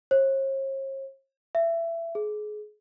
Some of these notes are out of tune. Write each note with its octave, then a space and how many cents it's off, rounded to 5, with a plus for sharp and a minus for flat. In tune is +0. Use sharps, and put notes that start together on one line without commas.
C#5 -45
E5 +25
G#4 +30